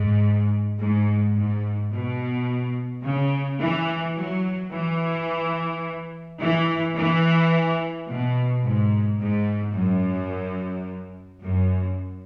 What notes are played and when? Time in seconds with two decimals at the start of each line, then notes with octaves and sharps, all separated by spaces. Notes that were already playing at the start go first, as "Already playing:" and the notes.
Already playing: G#2
0.79 G#2
1.35 G#2
1.92 B2
3.04 C#3
3.59 E3
4.16 F#3
4.72 E3
6.40 E3
6.96 E3
8.08 B2
8.64 G#2
9.20 G#2
9.75 F#2
11.44 F#2